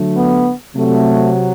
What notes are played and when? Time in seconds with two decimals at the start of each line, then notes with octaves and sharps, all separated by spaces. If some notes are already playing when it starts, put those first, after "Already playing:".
Already playing: D3 F#3 A3
0.16 B3
0.75 C3 F#3 A3